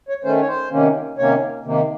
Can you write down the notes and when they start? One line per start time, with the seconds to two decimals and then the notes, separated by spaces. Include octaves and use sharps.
0.09 C#5
0.24 D#3 A3 C#4 C5
0.41 C#5
0.48 C5
0.71 C3 D#3 A#3 C#4
1.18 C3 D#3 A#3 C#4 C#5
1.64 C3 D#3 A#3